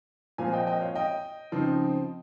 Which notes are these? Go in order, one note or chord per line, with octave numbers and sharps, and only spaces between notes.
A#2 F3 C4 F5 G#5
D#5 G5
D#5 G5
C#5 F5
D#5 G5
C#3 F3 C4 D#4